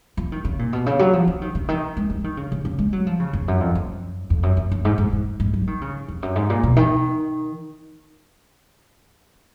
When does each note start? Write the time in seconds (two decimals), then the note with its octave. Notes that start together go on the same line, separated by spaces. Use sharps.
0.17 F3
0.32 D#3
0.45 C#3
0.59 A#2
0.73 B2
0.86 C#3
0.99 F#3
1.13 F3
1.28 F3
1.42 D#3
1.55 C#3
1.69 D#3
1.97 G#3
2.10 F3
2.24 D#3
2.37 C#3
2.52 C#3
2.65 C#3
2.79 G#3
2.93 F#3
3.07 F3
3.20 C#3
3.33 F2
3.48 F#2
3.60 F2
3.75 F#2
4.30 F2
4.43 F#2
4.57 F#2
4.72 F#2
4.85 G#2
4.98 G#2
5.13 G#2
5.40 G#2
5.54 F#3
5.67 D#3
5.81 C#3
6.08 F2
6.23 F#2
6.36 G#2
6.50 A#2
6.63 B2
6.76 D#3